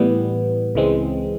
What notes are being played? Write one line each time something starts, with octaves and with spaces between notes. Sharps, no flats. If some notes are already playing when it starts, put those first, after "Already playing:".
Already playing: A2 E3 G3 B3
C#2 C#3 E3 G#3 C4